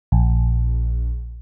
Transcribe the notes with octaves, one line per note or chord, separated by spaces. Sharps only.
A#1